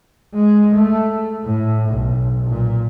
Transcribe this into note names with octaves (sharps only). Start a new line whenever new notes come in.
G#3
A3
A2
B1
A#2